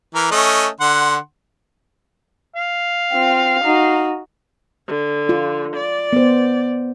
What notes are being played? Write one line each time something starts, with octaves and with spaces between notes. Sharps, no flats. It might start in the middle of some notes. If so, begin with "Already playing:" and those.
E3 A#4
A3 C#4 D#5
D3 F#5 C6
F5
C4 F4
D#4 F#4
D3
F4
D5
B3 C5